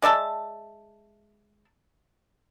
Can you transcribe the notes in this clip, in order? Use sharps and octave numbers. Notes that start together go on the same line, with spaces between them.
G#3 D5 E5 A5